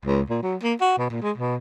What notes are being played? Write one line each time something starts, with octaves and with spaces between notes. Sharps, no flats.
C#2
A#2
F#3
A#3
F#4
B2
A#2
G#3
B2